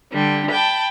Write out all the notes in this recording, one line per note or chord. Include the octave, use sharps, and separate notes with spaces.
D3 G3
G5 A5 B5